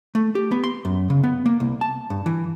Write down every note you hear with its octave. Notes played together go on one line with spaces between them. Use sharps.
A3
G4
B3
C6
F#2
C#3
B3
A#3
C2
A5
G2
E3